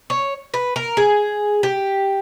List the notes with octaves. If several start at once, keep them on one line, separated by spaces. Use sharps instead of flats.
C#5
B4
A#4
G#4
G4